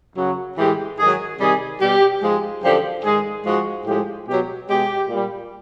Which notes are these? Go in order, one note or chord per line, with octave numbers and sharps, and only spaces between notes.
F#2 C#3 F#3
A2 E3 G#3 G4
G#2 D#3 F#3 G#4
C3 D#3 G3 G#4
B2 G3 G4
G#2 F3 G#3
F#2 D3 F3 G4
G#2 D#3 G#3 G#4
G#2 F3 G#3 F#4
A2 F3 G#3 G4
B2 F#3 G4
B2 G#3 G4
A#2 G3